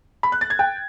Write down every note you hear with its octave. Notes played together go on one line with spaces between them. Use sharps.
B5
F#6
A6
G#6
G5